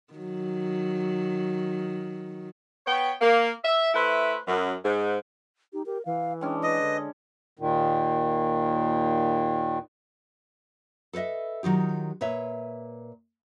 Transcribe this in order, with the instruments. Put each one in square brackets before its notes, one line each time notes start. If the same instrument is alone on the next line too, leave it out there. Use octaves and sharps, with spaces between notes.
[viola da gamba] D#3 F#3
[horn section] B3 C#5 G5
A#3
E5
A3 E4 B4 C5
F#2
G#2
[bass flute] D#4 [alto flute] G4
[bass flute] G4 [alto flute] A#4
[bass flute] E3 [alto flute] F5
[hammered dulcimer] G#3 C#4 D4 [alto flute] G5
[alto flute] B4 [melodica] D#5
[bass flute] D3
[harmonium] D#2 A#2 D#3
[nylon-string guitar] A4 B4 C5 D#5 E5
D#3 F#3 F4 G4
A#2 B4 C#5 E5